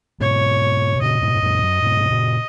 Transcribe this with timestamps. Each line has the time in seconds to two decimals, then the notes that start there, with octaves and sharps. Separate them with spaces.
0.20 G#2 B2 C#5
0.96 B2
1.01 A#2 C#3 D#5
1.22 G#2 B2
1.35 G#2
1.42 F#2 A#2
1.63 F#2
1.82 G#2 B2
2.00 B2
2.11 A#2 C#3